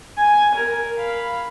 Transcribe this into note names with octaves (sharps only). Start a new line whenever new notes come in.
G#5
A#4
F5 B5